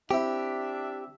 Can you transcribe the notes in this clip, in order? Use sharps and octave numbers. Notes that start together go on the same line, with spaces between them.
C4 D4 E4 G4 E5